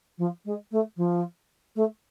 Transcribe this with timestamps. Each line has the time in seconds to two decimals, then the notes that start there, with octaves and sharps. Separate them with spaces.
0.18 F3
0.45 G#3
0.71 A3
0.97 F3
1.76 A3